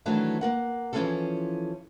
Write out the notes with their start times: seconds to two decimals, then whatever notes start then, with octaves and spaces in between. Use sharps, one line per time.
0.06 D#3 E3 F#3 A3 D4
0.41 A#3 A#4 F#5
0.93 E3 F3 C4 C#4 G#4 A4